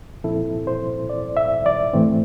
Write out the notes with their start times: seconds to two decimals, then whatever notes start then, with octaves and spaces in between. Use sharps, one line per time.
0.24 A#2 F3 C4 E4 A4
0.67 C5
1.10 D5
1.37 E5
1.66 D5
1.93 A2 E3 A3 C4